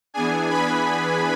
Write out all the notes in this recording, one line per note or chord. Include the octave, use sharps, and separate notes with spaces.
E3 B3 D4 G#4 G#5
B4 B5